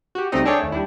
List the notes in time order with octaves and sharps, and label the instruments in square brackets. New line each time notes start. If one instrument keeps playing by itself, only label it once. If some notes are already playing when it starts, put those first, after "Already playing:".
[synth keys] F#4 G4
C#2 G3 A3 C4 D#4 D#5
D4 G#4 A4 C#5 D5 G5
D#2 A3
G3 D4 E4